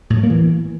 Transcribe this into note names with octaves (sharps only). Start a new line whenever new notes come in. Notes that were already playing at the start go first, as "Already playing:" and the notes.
A2
F#3
A#3
E3